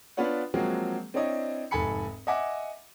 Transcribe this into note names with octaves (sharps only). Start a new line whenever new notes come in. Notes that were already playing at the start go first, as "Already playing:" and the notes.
B3 D4 F4 B4 C#5 F#5
F3 F#3 G#3 A#3 C4 F#4
C4 D4 E4 C#5 D#5
F1 G#2 A4 G#5 B5 C#7
D#5 E5 F#5 G#5 D6